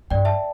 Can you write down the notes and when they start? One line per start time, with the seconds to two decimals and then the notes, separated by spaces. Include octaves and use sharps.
0.10 G2 D5 G5
0.25 E5 A5